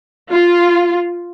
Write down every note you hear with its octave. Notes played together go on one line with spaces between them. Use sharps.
F4